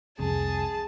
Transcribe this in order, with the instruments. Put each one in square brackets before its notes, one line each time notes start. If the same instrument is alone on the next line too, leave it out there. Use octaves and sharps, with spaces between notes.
[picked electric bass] C2 F2 C3 [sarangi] G#4 [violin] A5